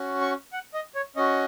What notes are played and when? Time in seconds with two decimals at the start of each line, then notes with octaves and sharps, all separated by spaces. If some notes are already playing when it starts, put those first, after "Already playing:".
Already playing: C#4 F#4
0.21 C#6
0.53 F#5
0.74 D#5
0.95 C#5
1.16 C#4 F#4 D#5